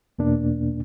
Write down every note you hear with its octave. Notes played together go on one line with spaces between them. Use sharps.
E2 B2 A#3 D4